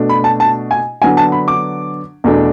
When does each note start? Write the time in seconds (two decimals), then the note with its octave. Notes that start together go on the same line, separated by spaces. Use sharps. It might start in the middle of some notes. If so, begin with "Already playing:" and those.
Already playing: B2 A3 D4
0.09 B5
0.24 A5
0.40 A5
0.71 G#5
1.02 D3 F#3 B3 D4 G#5
1.17 A5
1.32 B5
1.48 D6
2.24 E2 B2 A3 D4